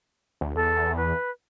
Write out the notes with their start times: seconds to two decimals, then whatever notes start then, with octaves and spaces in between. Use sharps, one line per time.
0.41 D2
0.55 E2 A4
0.97 B4